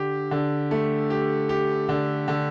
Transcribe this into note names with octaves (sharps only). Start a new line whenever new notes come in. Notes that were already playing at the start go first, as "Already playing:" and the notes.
Already playing: D3 G4
D3
A3
G4
G4
D3
D3